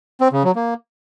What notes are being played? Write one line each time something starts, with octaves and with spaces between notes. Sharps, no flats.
C4
C#3
F#3
A#3